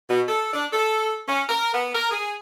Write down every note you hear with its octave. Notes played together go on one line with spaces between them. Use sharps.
B2
A4
D4
A4
C#4
A#4
B3
A#4
G#4